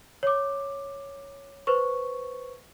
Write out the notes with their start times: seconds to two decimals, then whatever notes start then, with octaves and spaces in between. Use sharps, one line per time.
0.23 C#5 D6
1.67 B4 C5 C#6